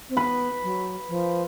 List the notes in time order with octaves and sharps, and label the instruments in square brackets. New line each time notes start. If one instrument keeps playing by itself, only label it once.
[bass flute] C4
[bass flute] B3 [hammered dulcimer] B4
[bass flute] F#3
F3